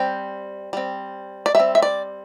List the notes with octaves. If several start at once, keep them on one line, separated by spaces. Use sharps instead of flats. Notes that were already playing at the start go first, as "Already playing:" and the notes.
Already playing: G3 C4 G5
G3 C4
D5
G3 C4 E5
E5
D5